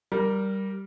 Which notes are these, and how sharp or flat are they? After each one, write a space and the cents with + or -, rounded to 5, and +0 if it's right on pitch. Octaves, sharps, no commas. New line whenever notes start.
G3 -10 A#4 +0